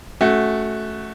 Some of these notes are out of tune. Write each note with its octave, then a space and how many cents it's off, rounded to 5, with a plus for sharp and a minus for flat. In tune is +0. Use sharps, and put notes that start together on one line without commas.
A3 -15 C#4 +0 F#4 +0